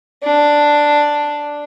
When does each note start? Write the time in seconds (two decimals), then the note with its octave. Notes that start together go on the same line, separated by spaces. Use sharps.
0.23 D4